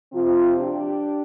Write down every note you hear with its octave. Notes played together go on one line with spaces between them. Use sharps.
C3 F3 C4 F4
D4 G4